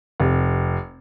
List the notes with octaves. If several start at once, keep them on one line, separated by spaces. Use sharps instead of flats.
F1